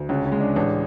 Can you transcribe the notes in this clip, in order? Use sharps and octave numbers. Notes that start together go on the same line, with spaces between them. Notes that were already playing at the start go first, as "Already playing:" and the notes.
Already playing: D2
C#2 C#4
C#4
G#3
D4
A1 D4